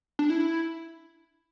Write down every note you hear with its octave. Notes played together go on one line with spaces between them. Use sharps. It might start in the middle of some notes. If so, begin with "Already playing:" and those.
D4
E4